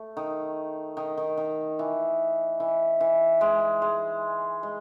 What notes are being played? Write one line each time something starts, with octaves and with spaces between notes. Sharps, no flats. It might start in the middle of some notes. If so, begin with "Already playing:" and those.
Already playing: A3
D#3
D#3
D#3
D#3
E3
E3
E3
G#3
G#3
G#3